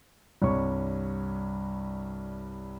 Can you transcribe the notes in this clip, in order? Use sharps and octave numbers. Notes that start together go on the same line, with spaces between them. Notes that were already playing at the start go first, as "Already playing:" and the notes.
C2 G2 C#5 C#6